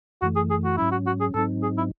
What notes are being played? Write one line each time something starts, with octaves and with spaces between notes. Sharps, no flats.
F#2 E3 A3 F#4
G#4
G#4
F#4
G#2 F#3 C#4 E4
F#4
F#4
G#4
G#2 F#3 C4 D#4 A4
G#4
E4